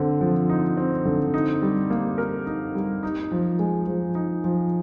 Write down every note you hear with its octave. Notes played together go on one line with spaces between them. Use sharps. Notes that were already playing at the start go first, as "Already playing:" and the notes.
Already playing: D3 C4
F3
D#4
C4
D3
D#4
G3
A#3
A#4
D#4
G3
D#4
F3
G#3
F3
D#4
F3